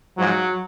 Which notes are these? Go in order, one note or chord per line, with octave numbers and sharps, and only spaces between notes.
G#2 F3 F#3